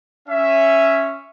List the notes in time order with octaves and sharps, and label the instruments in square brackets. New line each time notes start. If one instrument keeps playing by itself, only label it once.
[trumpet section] C#4 E5